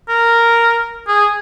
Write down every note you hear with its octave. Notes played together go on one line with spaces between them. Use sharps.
A#4
G#4